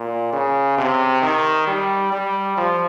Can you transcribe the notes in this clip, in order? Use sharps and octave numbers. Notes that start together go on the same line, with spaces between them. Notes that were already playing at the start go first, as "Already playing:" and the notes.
Already playing: A#2
C#3
C3
D#3
G3
G3
F3